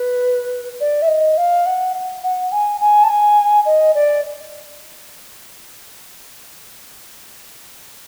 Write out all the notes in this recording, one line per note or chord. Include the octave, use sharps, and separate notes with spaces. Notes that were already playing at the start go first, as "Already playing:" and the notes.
Already playing: B4
D5
E5
D#5
F5
F#5
F#5
G#5
G#5
A5
G#5
D#5
D5